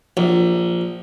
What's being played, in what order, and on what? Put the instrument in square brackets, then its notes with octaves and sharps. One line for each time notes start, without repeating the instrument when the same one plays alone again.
[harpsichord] A#1